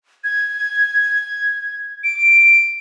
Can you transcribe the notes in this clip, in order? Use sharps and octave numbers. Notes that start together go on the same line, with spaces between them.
G#6
D7